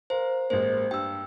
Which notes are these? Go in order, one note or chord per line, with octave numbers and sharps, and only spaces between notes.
A#4 C5 F5 A#5
A1 G#3 A#3 C5
G2 G5 E6